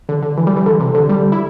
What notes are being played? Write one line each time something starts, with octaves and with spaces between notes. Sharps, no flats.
D3
D3
E3
G3
E3
D3
C3
D3
G3
E4